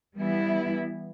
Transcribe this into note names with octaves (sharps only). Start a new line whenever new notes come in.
E3 G3 B3 E4